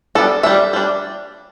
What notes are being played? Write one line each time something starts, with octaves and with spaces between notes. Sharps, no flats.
G3 B3 D4 A4
G3 D4 E5
G3 D4